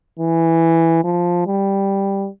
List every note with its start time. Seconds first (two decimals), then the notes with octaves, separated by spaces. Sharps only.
0.19 E3
1.04 F3
1.47 G3